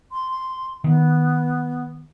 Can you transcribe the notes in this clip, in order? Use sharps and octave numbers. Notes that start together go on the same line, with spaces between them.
C6
D#3 B3